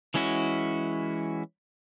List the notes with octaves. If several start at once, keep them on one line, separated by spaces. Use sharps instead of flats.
E3 G#3 C#4 E4 F#4